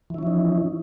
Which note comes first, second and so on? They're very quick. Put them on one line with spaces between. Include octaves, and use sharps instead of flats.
E3 E4 C#4 F3 D#4